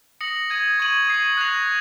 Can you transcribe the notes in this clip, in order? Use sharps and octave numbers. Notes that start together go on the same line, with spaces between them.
D#6 A#6 C#7 F#7
D#6 G#6 D#7 F#7
C#6 G#6 D#7 F#7
D#6 G#6 C7 D#7
F#6 A#6 F7